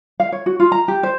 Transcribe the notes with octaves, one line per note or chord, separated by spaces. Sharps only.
F5
C#5
F#4
F4
A#5
G4
C5